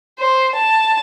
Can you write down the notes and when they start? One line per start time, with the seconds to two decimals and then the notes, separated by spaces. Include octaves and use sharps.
0.19 C5
0.55 A5